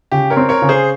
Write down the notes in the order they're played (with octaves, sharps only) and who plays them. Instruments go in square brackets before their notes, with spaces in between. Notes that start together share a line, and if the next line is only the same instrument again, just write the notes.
[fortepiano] C#3 [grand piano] G4
[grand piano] A#4 C#5
[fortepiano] C4
[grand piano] A#4 C#5
[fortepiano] C#3
[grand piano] G#4 C5